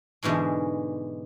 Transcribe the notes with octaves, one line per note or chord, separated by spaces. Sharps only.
G#2 B2 D3 E3 G#3